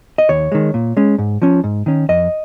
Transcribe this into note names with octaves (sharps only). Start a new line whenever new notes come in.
D#5
D#2 C#5
D#3 G#3
A#2
G#3 C#4
G#2
F3 C#4
G#2
D#3 C#4
F2 D#5